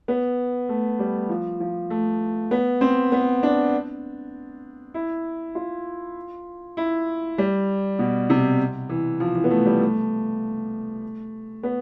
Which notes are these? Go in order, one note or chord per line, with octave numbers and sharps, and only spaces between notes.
B3
A3
G3
F3
F3
A3
B3
C4
B3
D4
E4
F4
E4
G3
B2
C3
E3
F3
E3
B3
A3
G3
A3
B3